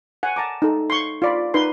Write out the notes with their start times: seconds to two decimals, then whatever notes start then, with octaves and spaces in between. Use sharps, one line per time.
0.23 F#5 G#5
0.36 F#5 A5 A#5 D6
0.62 D#4 A4
0.90 C6 C#6
1.22 F4 D5 B5
1.54 D#4 B4 C6